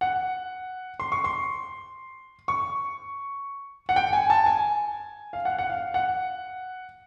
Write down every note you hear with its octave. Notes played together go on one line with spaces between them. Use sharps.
F#5
C6
C#6
C6
C#6
F#5
G5
G#5
A5
G#5
F5
F#5
F#5
F5
F#5